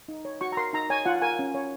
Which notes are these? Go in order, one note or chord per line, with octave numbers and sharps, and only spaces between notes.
D#4
C#5
F#4 C#6
A#5
A#4 C6
D#4 A#5
C#5 G#5
F4 F#5
A#4 G#5
C#4
C#5